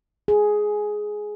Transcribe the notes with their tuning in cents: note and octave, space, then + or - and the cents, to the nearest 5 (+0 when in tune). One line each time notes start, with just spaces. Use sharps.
G#4 +10